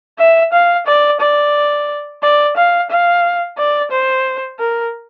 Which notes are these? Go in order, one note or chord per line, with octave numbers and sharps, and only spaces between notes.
E5
F5
D5
D5
D5
F5
F5
D5
C5
A#4